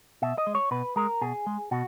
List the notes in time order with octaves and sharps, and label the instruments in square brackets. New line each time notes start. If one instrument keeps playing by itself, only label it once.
[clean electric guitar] B2 E5
D#5
G#3
C#5
B2 B4
G#3 A#4
B2 G#4
G#3
B2 F#4